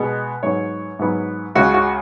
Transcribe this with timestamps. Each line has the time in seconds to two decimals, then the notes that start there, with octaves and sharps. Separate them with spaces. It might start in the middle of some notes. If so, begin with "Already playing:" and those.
Already playing: B2 G#3 B3
0.43 G#2 F#3 B3 C#5
0.99 G#2 F#3 B3
1.55 C#2 C#3 G#3 C#4 F#4
1.74 F#4